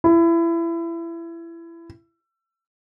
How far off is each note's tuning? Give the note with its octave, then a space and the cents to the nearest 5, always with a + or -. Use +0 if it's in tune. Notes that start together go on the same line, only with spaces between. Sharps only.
E4 +25